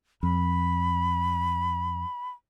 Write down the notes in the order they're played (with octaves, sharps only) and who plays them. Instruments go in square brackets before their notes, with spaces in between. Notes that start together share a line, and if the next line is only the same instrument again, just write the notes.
[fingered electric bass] F2 [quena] B5